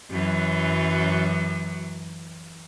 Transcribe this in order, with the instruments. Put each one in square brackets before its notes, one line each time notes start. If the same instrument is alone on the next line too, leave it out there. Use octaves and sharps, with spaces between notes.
[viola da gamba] F#2 E3 F#3